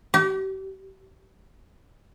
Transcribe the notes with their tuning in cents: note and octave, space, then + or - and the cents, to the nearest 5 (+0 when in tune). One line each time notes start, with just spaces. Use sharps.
G4 -40